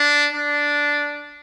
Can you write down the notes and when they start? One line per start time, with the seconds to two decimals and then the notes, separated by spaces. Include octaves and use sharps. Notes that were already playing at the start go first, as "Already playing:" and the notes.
Already playing: D4
0.33 D4